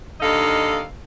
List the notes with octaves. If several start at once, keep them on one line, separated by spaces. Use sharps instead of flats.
D#2 D3 D#4 A4 D#5 F5